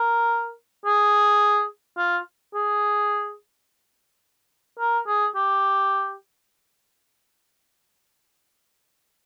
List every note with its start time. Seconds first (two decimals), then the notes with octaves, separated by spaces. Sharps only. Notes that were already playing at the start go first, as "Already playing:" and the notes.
Already playing: A#4
0.85 G#4
1.98 F4
2.54 G#4
4.79 A#4
5.07 G#4
5.36 G4